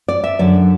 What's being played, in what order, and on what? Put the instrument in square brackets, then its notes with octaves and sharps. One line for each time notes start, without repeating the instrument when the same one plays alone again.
[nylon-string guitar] D5
E5
F#2 D3 F#3 D5